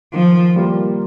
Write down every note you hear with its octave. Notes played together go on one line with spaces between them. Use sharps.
D#3 F3
G3 A#3 F4 A#4